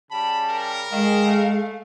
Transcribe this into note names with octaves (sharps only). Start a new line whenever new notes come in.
C#3 G3 G4 A5 B5
A#4
D3 D#3 G#3 F5
A3